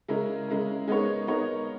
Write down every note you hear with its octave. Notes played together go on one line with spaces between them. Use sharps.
C#3 G#3 C#4 E4 A#4
C#3 G#3 C#4 E4 A#4
G#3 B3 D#4 A#4 C#5
G#3 B3 D#4 A#4 C#5